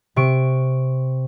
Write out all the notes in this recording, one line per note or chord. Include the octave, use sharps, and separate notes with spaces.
C3 C#6 D7